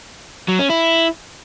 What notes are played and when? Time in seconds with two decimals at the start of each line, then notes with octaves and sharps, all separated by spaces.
0.48 F#3
0.59 C#4
0.70 E4